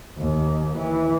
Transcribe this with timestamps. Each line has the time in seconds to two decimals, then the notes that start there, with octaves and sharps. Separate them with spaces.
0.18 D#2
0.77 E3